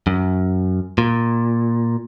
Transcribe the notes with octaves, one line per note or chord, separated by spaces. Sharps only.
F#2
A#2